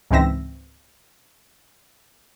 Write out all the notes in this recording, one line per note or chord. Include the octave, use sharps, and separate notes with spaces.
C#2 G#2 E3 C4 E5 A#6